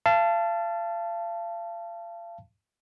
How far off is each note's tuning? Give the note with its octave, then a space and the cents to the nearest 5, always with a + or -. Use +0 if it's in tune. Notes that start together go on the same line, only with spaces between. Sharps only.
F5 -35 A5 +0